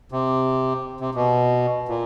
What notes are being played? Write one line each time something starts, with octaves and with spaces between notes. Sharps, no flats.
C3
C3
B2
A#2